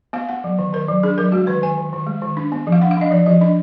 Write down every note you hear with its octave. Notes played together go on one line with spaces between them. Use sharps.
B3 F5
B3 F#5
F#3
D#3
D#3 A#4
F#3
D4 G#4
F#3 A#4
G#3 F#4
D#3 B4
D#3 G#5
D#3
D#3
G#3
D#3
D4
B3
F3
F5
D4 F#5
F5
D4 D#5
F3 D5
F3 D#5
D4 D#5